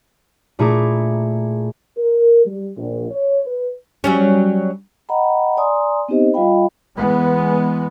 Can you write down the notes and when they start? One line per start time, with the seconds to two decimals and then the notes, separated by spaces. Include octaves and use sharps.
0.59 A#2 A3 E4 G#4 A#5 D6
1.98 A#4
2.46 G3
2.77 A#1
3.11 C#5
3.46 B4
4.04 F#3 G3 C#4
5.09 D#5 F#5 G5 A#5 B5
5.57 D5 G#5 A#5 C6 D#6
6.09 B3 C4 D#4 G4 C5 D#5
6.34 G3 F4 D#5 F5 G5 B5
6.96 E3 G#3 B3